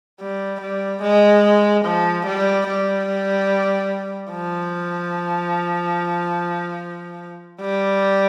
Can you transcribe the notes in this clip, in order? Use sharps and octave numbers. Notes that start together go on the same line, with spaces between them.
G3
G3
G#3
F3
G3
G3
F3
G3